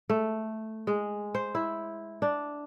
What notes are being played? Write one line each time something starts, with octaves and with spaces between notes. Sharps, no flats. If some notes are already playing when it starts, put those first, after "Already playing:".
A3
G#3
C5
E4
D4